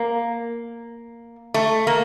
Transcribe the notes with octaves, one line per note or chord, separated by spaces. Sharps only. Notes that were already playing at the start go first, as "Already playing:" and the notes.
Already playing: A#3
A3
A#3